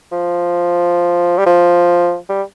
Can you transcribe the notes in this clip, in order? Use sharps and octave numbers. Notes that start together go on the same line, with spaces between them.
F3
G3
F3
G3